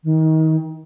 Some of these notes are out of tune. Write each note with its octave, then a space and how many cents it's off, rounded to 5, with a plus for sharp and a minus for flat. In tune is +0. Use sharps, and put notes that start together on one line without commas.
D#3 +30